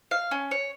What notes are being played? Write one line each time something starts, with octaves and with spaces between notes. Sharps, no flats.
F5
C#4
C#5